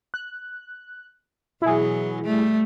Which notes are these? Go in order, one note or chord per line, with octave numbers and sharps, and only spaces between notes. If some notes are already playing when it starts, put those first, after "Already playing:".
F#6
B2 E3 F#3 E4 G#4
G3 A3